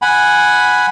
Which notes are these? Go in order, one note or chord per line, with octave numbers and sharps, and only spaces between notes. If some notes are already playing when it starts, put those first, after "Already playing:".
F#5 G#5 B5